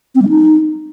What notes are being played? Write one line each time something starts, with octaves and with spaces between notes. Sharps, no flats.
C4
G3
D#4